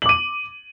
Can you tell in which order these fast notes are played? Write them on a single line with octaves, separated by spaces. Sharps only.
F#7 D6 D#7